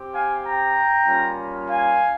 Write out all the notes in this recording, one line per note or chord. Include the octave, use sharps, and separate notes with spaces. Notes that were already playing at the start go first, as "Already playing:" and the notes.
Already playing: C4 G4
F5 G#5
G5 A#5
G3 A#3 C#4 F4
F5 G#5